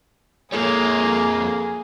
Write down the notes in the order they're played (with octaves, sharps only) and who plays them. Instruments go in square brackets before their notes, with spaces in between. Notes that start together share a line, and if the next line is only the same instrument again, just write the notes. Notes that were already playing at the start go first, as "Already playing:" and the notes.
[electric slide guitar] F2 A4 C#5 [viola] A#3 [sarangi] G#4